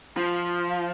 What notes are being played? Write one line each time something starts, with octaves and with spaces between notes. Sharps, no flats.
F3